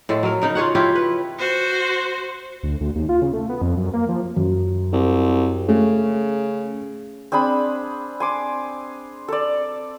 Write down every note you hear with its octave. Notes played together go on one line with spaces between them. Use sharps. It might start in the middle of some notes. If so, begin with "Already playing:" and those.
A2 G#3 A4
F#3 A#4
C#3 D#4 A#4
F4 G#4 C#5 F#5
C#4 E4 F4 G4
B4
F#4 C5
D2
D2
D#2
F4
C#3
A3
B3
F2
F#2
A#3
F3
F#2
C2
C#3 A3
C4 D4 G#4 B5
G#5 C6 D6
A4 D5